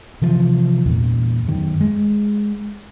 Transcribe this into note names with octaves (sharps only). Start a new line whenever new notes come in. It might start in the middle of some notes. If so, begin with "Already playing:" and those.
C3 E3 F3
E2 A#2
F#2 D#3
G#3